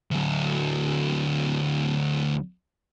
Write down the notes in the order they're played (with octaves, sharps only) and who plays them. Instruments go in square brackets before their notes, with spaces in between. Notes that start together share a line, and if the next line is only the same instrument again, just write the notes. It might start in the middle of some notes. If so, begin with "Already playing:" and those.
[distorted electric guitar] D2 F#3